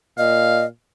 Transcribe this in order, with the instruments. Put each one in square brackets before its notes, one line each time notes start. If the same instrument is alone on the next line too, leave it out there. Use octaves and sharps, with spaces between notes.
[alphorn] A#2 [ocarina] D#5 [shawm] F5